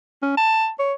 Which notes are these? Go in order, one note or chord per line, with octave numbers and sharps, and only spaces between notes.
C#4
A5
C#5